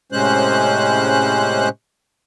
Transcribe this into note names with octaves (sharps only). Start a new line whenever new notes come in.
A2 C3 G#3 C#4 C5 F#6